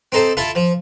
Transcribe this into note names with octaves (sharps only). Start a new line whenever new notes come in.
C4 D#4 A4 C5
E4 F4 A4
F3